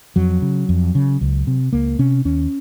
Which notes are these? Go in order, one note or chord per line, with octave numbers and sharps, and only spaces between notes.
F2 F#3
C#3
F2
C#3
C#2
C3
C#2 A#3
C3 C#4
D#2 C#4